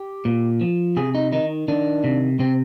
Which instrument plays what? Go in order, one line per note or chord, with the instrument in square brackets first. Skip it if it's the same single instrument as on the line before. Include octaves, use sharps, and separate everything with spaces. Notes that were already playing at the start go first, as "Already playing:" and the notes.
Already playing: [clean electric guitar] G4
A#2
F3
C3 G#4
D#4
D#3 D#4
D#3 D4
C3
C3 C4